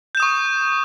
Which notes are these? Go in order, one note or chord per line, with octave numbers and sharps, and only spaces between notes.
C#6 D#6 G6 E7